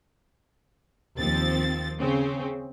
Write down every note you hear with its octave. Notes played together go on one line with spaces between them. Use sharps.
D#2 F3 C4 A6
C#3 C4 C#4